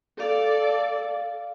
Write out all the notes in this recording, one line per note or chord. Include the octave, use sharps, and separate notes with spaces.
A4 D5 F5